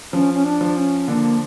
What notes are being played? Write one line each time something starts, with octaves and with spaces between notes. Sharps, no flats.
F3 C#4
C#4
D4
F3
C#4
D3 A#3